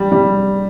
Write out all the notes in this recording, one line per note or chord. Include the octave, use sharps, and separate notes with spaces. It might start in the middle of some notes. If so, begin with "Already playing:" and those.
Already playing: G3
G3